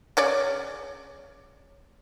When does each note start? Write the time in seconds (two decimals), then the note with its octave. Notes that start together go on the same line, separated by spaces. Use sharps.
0.17 C#3 C#5 D5